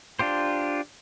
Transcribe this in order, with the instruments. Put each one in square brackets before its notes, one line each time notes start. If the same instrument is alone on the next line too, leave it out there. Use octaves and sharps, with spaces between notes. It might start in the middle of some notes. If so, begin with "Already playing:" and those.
[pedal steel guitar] D4 F4 G4 C5